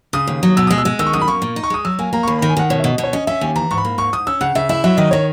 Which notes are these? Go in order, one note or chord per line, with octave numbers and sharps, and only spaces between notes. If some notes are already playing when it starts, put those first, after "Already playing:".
C#3 D#6
D#2
F#3
B2 E6
G#3 D#6
E6
G#3
D#3 E6
C#6
F#2 D#6
B5
A#3 C#6
A#2
D#4
C#6
G#3 D#6
F#3 E6
A#3 G#5
A#3 A#5
C#6
D#2 B5
D#3 B5
G#5
D#3 F#5
B2 C#5
E5
B2 D#5
B2
C#5
C#4 D#5
C#4 E5
D#2 G#5
E3 A#5
G#2 C#6
B5
A#3
G#2 C#6
G#2 D#6
C#4 E6
C#3 F#5
C#3 E5
E4 E5
F#3 E5
D#3 D#5
D#3 C#5